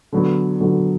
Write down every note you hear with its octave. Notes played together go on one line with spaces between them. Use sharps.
D3 F#3 B3
D3 F#3 B3